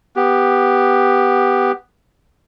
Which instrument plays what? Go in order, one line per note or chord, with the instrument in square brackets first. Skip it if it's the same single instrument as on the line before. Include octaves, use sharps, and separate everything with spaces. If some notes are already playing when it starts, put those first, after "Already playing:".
[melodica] B3 G4